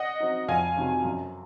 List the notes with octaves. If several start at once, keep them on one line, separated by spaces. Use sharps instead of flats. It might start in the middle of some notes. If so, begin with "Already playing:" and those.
Already playing: D#5 F#5
F#3 C4 D#4
F2 F5 G#5
C3 D#3 F#3
F#2